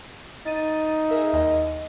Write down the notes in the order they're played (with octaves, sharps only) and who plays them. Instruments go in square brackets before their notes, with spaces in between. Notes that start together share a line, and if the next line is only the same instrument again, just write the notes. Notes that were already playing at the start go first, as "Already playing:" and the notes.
[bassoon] D#4 [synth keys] A6 D#7
[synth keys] G#4 A#4 E5
D#2 D#5